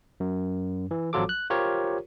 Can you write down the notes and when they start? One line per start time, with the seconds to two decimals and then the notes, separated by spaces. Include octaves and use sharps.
0.20 F#2
0.91 E3
1.13 G#1 F3 F#3 F4 A4 D6
1.29 F#6
1.50 F4 G4 A#4 C5 C#5